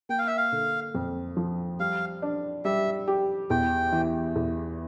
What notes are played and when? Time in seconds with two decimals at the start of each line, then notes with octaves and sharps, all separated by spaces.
0.09 A#3 G5
0.18 F5
0.27 E5
0.37 F5
0.52 D3
0.94 F2
1.37 F3
1.79 G3 F5
2.22 D4
2.65 G3 E5
3.08 G4
3.50 E2 G5
3.92 E3
4.36 E2